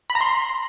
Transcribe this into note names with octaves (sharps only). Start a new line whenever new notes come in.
B5
A#5
C6